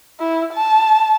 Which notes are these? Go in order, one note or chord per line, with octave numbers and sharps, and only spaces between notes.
E4
A5